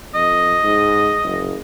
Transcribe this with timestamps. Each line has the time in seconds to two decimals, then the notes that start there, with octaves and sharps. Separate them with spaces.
0.15 F2 D#5
0.63 G#2
1.24 F#1